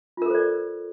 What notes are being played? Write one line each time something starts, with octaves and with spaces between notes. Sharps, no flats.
F4 A4 A#4 C5 D5